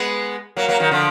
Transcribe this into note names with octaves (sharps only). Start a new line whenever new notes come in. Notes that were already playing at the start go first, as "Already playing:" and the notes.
Already playing: G#3 B3
F#3 A#3
F#3 A#3
D#3 F#3
D3 F3